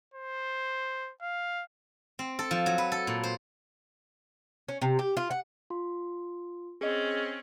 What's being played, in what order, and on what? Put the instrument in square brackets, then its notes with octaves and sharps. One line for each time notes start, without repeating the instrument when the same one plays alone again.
[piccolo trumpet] C5
F5
[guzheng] C4
A4
F3
F#3
B4
A4
A#2
C5
[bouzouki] C#4
C3
G4
F4
F#5
[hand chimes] F4 C6
[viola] C4 C#4 [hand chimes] G#4 D#5